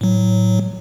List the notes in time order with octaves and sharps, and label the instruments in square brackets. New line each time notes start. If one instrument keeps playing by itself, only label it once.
[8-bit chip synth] A2 F#3